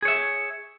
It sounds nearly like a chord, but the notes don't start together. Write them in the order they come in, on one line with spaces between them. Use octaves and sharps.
G#4 C#5 E5